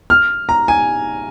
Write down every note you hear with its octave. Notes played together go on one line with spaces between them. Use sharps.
F6
A#5
G#5